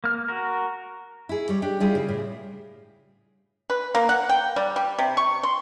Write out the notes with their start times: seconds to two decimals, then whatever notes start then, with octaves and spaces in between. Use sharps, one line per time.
0.04 A#3 F6
0.28 F#4 A#4
1.29 E4 G#4
1.49 G3 C#5
1.62 D4 G4
1.80 G3 E4 F4 G#4
1.95 C#3
2.09 A2
3.70 B4
3.95 A#3
4.09 F#5
4.29 G5
4.56 G3
4.76 G3
4.99 C3
5.17 C#6
5.43 C6